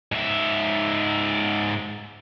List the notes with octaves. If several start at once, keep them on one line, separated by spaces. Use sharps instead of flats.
G#2 E5